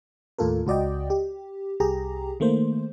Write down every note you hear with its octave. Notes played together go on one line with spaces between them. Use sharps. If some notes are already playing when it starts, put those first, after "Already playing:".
D#2 A2 F4 A4 A#4
C#2 F#4 D5 D#5 G5
G4
C2 G4 G#4 A#5
D#3 A3 A#3 C5